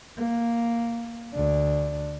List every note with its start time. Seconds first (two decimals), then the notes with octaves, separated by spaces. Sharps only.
0.18 A#3
1.34 D2 D4